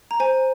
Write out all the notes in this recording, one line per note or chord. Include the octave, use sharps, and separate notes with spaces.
A#5
C5 G#5